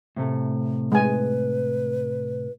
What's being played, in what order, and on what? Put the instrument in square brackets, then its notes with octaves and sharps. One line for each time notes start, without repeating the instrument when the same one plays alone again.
[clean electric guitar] A2 C3 A3
[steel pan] G#3 G#5 [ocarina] B4